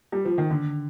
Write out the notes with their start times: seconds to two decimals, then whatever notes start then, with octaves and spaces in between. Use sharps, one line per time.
0.12 G3
0.25 F3
0.38 D#3
0.50 D3